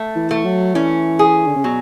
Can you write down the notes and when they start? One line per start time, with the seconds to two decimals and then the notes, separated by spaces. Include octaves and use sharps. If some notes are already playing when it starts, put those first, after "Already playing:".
Already playing: A3
0.16 E3
0.31 A3
0.45 F#3
0.74 E3 C#4
1.19 G#4
1.47 D3
1.56 C#3
1.64 B2 F#3